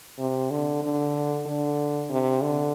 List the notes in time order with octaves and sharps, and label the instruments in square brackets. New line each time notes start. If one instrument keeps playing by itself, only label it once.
[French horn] C3
D3
D3
D3
C3
D3